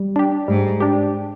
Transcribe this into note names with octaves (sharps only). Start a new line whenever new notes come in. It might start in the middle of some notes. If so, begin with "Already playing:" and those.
Already playing: G3
D4 G4
G#2 G3
D4 G4